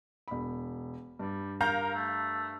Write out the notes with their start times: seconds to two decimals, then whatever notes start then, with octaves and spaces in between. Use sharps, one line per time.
0.28 E1 B5
1.19 G2 G3
1.61 A#4 F5 A#5 G6
1.94 A3